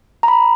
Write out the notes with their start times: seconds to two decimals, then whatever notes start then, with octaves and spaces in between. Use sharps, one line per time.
0.23 A#5
0.28 B5